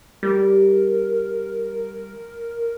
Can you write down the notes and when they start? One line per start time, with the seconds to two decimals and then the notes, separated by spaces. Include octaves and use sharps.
0.23 G3 A#4